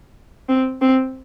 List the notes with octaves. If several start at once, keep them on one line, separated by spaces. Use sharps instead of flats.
C4
C4